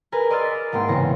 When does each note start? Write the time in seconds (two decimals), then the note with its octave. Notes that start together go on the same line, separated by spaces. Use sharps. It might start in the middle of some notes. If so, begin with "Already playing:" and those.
0.12 G#4 A#4 B4
0.30 D5 D#5 C6 E6 F6 A6
0.45 B6
0.72 C2 G#2 A#3 G5 C6
0.88 E2 A2 C#3 B3 A#6 C#7